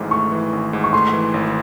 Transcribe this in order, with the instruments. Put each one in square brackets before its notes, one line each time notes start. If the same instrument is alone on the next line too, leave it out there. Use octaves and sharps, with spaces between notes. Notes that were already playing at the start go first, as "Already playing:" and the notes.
Already playing: [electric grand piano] G#1 G#2 E3 A3
[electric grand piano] A3 [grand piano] C#6
[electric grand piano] E3
G#1
G#2
[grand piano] C#6
[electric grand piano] A3 [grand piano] C6
[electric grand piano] E3
G#1